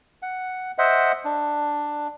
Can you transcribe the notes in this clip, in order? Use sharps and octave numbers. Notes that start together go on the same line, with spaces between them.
F#5
C5 D#5 E5 F#5
D4